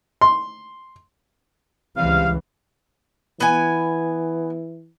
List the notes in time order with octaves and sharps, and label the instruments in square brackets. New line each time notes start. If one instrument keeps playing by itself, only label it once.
[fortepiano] C6
[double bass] C#2 E3 [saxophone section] C3 G3 F5
[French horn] E3 [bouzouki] B3 G#5